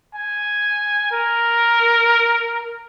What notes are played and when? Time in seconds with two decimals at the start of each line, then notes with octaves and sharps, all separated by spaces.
0.15 G#5
1.12 A#4